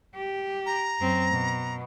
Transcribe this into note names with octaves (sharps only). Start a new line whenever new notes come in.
G4
A#5
F#2 C4
B2